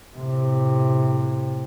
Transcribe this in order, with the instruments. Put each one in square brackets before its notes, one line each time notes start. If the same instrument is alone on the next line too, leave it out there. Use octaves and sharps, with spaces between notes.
[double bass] A2 C3